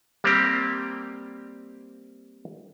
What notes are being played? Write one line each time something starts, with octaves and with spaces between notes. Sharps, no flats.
G3 A#3 C4 G4